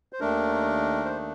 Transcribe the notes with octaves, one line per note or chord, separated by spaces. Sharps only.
C5
D#2 D#3 A3 D4 A#4
C5